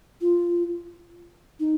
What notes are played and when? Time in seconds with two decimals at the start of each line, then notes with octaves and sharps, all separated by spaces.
0.21 F4
1.60 D#4